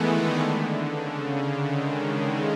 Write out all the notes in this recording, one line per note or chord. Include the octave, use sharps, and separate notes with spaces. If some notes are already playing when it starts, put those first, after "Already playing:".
Already playing: D#3 E3 G#3 A3 B3
D3
D3
C#3
D3
D#3
G#3